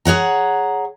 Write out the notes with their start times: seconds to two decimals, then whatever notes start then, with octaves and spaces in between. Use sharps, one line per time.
0.05 G#4 C#5 F#5 A#5